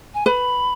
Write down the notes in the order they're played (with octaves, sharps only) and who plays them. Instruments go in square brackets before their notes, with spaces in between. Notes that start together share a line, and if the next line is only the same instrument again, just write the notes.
[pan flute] G#5
[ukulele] B4 [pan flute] B5